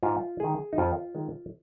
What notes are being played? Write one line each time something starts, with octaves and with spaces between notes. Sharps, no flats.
G#2 F4
D#3 G#3 G#4
D#4
F2 F4
D#3 G#3